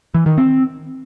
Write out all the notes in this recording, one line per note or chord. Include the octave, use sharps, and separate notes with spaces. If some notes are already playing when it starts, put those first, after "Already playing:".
E3
D#3
C4